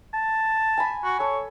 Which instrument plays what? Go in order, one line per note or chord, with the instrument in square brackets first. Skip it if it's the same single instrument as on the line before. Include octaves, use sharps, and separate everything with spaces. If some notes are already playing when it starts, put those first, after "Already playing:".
[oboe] A5
[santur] G#5 B5
[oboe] F#4
[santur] A4 [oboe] C#5